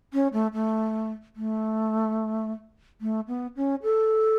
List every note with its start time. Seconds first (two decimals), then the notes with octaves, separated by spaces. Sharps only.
0.13 C#4
0.33 A3
0.54 A3
1.36 A3
3.01 A3
3.28 B3
3.56 C#4
3.83 A4